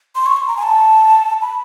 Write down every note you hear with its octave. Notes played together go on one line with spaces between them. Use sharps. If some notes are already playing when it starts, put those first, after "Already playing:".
C6
C#6
C6
A#5
G#5
A5
B5